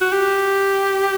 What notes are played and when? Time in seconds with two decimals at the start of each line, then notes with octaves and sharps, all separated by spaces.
0.01 F#4
0.12 G4